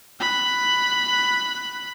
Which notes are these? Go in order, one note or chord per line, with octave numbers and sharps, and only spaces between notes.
B5 F#6